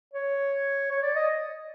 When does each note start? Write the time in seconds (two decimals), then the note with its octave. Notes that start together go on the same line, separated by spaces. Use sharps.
0.13 C#5
0.91 C#5
1.03 D5
1.15 D#5